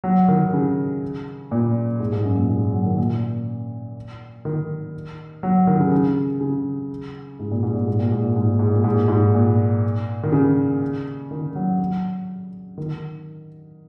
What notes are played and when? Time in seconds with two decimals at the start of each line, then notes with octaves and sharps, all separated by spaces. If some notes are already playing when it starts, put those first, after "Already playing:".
0.04 F#3
0.28 D#3
0.53 C#3
1.51 A#2
2.00 G#2
2.12 G#2
2.25 F#2
2.37 A#2
2.49 G#2
2.73 F#3
2.86 D#3
2.98 A#2
4.45 D#3
5.43 F#3
5.67 D#3
5.80 C#3
5.92 C#3
6.41 C#3
7.39 G#2
7.51 A#2
7.63 G#2
7.75 A#2
7.87 G#2
7.99 A#2
8.12 G#2
8.24 A#2
8.36 G#2
8.48 A#2
8.59 G#2
8.72 A#2
8.84 G#2
8.96 A#2
9.08 G#2
9.35 A#2
10.23 D#3
10.32 C#3
11.31 D#3
11.56 F#3
11.80 F#3
12.78 D#3